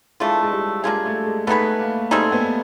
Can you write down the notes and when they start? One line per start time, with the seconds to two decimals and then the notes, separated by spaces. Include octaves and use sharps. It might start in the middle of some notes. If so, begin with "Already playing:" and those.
0.20 E3 G#3 A3 D4 F4
0.42 G#3
0.52 G3
0.84 G#3 A#3 D4 F4 G#4
1.05 A3
1.26 G#3
1.47 A3 B3 D#4 G#4 B4
1.80 A#3
2.11 G3 A3 C4 D#4 G#4
2.32 B3